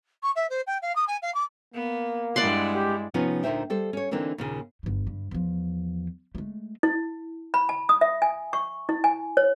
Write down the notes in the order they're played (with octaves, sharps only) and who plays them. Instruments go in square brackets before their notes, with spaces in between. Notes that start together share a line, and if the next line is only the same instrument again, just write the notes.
[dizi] C#6
E5
C5
G5
F5
D#6
G#5
F5
D6
[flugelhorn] A#3 [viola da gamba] B3
[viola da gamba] G2 E4 [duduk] G#3 [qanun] D5 F#5 C6
[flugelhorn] G4
[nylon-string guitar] C3 F3 B3 C#4 D#4 F4
D2 A#2 D#4 C5 E5 G5
G3 A4 C5
C#4 C#5
D3 E3 A#3 C4 D4 D#4
D#2 A#2 C#3
[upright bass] G1 G2
G2
E2 F3
G#3 A3
[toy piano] E4
B5
A5
D#6
E5
G#5
C#6
E4
G#5
C#5